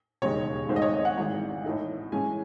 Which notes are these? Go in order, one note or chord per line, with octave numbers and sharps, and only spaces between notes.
E1 D#2 C#3 G#3 D#4 C#5
G#1 G#2 D#3 A3 C4 C5
D#5
C#5
D#5
F#5
G#1 G#2 E3
A2 E3 A3 D#4
A2 E3 G#3 C#4 G#5